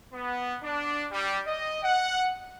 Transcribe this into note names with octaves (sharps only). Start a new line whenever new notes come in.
B3
D4
G3
D#5
F#5